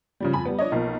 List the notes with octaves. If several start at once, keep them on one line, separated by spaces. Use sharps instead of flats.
C#3 F3 G3
F2 G#5 B5
G3 B3
F3 D4 C#5 D#5
B1 F3 A#3